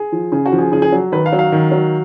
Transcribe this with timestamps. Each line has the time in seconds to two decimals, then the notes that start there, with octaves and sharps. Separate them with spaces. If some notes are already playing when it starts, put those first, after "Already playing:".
Already playing: G#4
0.12 F3
0.32 C#3 G#4
0.46 F#4
0.52 F3
0.58 G#4
0.72 C#3 G#4
0.82 G#4
0.92 F#3
1.12 D#3 B4
1.26 F5
1.32 F#3
1.39 F5
1.52 D#3
1.72 F#3